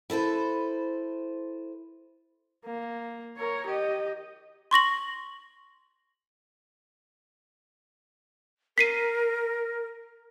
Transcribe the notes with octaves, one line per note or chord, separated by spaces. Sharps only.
E4 A4 B4 C5
A#3
A#4 C#5
G4 D#5
C6 C#6 A#6 F#7
A#4 B6 C7 D#7